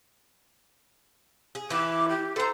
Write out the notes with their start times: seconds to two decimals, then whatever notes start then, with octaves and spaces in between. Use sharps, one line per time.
1.55 G#4
1.70 E3 E4 D6
2.09 G4
2.36 A4 C5 A#5